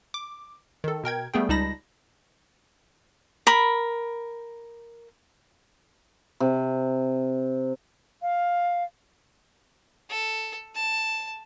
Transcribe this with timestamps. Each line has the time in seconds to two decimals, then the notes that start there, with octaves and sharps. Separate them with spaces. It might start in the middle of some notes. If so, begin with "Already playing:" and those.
0.14 D6
0.84 D#3 A4
1.04 B2 A#4 G5 G#6
1.34 G3 A3 B3 G#4 G5
1.49 C#2 G3 D#4 A5 B5 A#6
3.47 A#4 B5
6.40 C3
8.22 F5
10.10 A4
10.75 A5